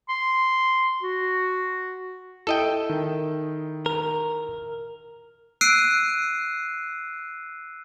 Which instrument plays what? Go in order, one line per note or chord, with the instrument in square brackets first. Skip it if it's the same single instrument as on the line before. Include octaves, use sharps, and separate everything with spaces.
[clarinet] C6
F#4
[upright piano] E4 [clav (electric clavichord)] A4 D#5 G5
[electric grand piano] D#3
[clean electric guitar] A#4
[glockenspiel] E6 F#6 C7 D7 D#7